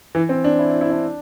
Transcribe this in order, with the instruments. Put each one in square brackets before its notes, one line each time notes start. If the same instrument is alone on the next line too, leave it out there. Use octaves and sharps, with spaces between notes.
[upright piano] E3
C4
D4
E4
E4
E4
D4